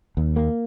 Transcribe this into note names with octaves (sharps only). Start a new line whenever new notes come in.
D#2
A#3